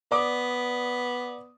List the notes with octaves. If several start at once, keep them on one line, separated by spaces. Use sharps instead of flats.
B3 D5 D6 D#6